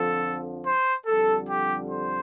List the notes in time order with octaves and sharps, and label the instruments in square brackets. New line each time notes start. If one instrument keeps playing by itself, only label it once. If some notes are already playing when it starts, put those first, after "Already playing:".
Already playing: [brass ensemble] F2 D3 F3 A4
C5
F2 D3 G3 A4
G4
C5